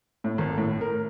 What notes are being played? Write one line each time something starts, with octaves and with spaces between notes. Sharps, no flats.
A2
G#1
A2
A#4